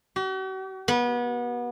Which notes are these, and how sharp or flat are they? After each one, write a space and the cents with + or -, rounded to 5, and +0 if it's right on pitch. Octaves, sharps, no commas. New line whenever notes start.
F#4 +45
B3 -30